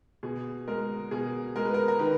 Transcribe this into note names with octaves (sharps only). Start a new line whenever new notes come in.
B2 G#4
G#3 A#4
B2 G#4
G#3 A#4
B4
A#4
A#4
D#3 B4